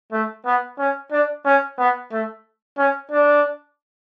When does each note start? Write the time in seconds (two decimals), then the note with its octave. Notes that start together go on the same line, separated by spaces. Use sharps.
0.12 A3
0.46 B3
0.79 C#4
1.12 D4
1.45 C#4
1.78 B3
2.12 A3
2.78 C#4
3.11 D4